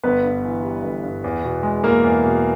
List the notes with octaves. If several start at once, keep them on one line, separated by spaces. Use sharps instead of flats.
G1 B3 B4
G2
E3
G3
G1
G2
E2
B2
G#3
E2 A#3 A#4
E2
B2